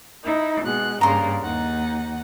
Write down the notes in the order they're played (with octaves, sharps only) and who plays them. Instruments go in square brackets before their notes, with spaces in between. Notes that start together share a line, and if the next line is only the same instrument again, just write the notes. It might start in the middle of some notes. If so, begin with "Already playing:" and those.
[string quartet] D#4 E4
B2 G#3 F#6
[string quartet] G2 C#3 A#3 [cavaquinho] A#5 C6
[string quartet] D#2 D#4 F#5